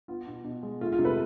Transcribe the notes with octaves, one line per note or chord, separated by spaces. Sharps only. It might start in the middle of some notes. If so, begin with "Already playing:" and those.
B3 F4
B2
B2
G#3
A3 F4
F4
C3
A4 B4